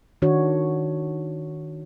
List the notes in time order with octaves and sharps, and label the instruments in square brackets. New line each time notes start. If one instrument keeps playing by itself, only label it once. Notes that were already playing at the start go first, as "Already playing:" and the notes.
[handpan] D#3 D4 F#4 C#5